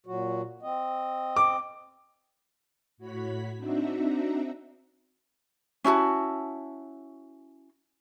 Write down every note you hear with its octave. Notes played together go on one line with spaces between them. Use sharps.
A#2 F#3 F#4
C4 D#5
D6
A2 F#4 C#5 B5 B6
C4 D4 D#4 F#4 E5 A#5
C#4 E4 F#4 A5